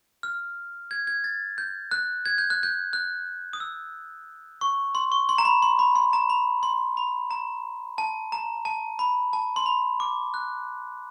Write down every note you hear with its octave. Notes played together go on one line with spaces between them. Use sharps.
F6
G#6
G#6
A6
G6
F#6
G#6
G6
F#6
G6
F#6
D#6
E6
C#6
C6
C#6
C6
A#5
B5
C6
B5
C6
A#5
B5
C6
B5
A#5
A5
A#5
A5
B5
A5
C6
B5
D6
F#6